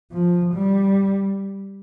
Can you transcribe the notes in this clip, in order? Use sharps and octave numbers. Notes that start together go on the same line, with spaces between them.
F3
G3